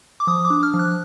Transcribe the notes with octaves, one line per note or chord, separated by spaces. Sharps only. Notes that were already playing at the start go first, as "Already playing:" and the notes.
D6
F3 D#6
D6
D4
F6
F3
F#6